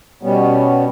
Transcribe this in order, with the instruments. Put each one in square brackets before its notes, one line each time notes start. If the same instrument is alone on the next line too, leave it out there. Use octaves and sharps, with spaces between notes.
[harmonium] B2 G3 B3 C#4